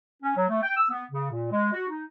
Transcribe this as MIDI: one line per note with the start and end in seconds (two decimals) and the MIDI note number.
0.23 0.33 61
0.36 0.48 54
0.49 0.61 57
0.62 0.72 79
0.77 0.87 88
0.90 1.03 59
1.11 1.28 49
1.31 1.49 46
1.52 1.71 56
1.73 1.85 66
1.89 2.05 63